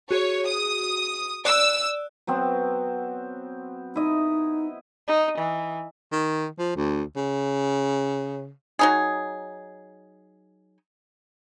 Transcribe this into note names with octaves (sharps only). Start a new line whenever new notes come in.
F#4 G#4 C#5
D#6
D5 E6 F#6
F#3 B3 C4
D#4 E4 D#5
D#4
E3
D#3
F3
D2
C#3
F#3 D#4 G#4